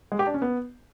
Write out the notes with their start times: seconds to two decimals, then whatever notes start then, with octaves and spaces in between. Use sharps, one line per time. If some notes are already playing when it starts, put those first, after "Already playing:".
0.12 G#3
0.19 G4
0.27 D4
0.34 C#4
0.42 B3